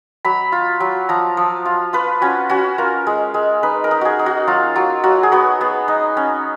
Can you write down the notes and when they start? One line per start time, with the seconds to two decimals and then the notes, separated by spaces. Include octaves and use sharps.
0.25 F#3 B5
0.52 F4
0.80 F#3
1.09 F3 A#5
1.37 F3
1.65 F4
1.93 F4 B4
2.21 C#4 F#4
2.49 C#4 F#4
2.78 F4 A#4
3.07 G#3
3.34 G#3
3.63 D#4 B4
3.84 A#4
3.91 D#4
4.01 F#4 G#4
4.19 D#4
4.26 F#4
4.47 F#3 F4
4.75 F#3 F4
5.03 F#3 F#4
5.23 G#4
5.32 B3 F#4
5.61 B3
5.88 D#4
6.17 C#4